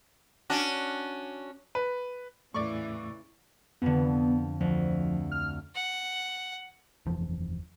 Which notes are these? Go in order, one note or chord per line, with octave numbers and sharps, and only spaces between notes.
C#4 D4 F#4
B4
E2 A2 C#3 E3 A3 D5 C#6
F2 D3 B3
D2 F3
F6
F#5
F#1 E2 E3 F3